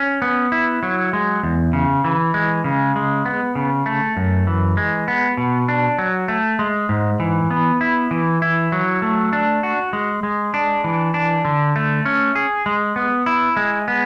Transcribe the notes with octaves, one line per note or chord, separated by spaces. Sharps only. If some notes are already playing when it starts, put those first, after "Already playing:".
Already playing: C#4
B3
E4
F#3
G#3
E2
C#3
E3
G#3
C#3
G#3
B3
C#3
A3
F#2
E3
G#3
B3
B2
D4
F#3
A3
G#3
G#2
E3
B3
E4
E3
E4
F#3
A3
D4
F#4
G#3
G#3
D4
E3
D4
D3
A3
C#4
G#4
G#3
B3
E4
G#3
B3